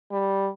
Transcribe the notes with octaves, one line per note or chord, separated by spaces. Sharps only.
G3